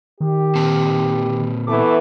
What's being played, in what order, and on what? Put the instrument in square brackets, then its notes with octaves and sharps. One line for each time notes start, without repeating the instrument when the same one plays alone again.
[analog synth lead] D#3 [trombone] G4
[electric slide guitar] A#2 C4 A5
[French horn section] E3 A3 B3 [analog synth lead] D6